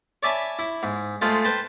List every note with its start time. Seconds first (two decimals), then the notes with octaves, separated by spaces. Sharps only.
0.23 C#5 D5 E5 G#5 A5 B5
0.59 E4
0.83 G#2
1.21 G#3 A3 F4 C5
1.44 B4 C5 G5 A5 B5